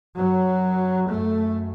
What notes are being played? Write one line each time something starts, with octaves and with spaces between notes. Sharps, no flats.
F#2 F#3
F#2 A3